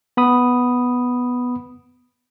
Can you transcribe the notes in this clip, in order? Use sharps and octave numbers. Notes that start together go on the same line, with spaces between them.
B3 B5 D#6